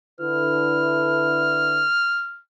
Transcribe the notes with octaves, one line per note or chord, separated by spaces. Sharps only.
D3 E4 B4 F6